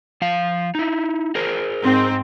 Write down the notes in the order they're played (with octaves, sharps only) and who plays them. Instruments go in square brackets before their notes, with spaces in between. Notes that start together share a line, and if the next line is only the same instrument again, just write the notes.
[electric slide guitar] F3 F5
D#4 E4
G#4 A#4 C5
[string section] G#2 C4 D#4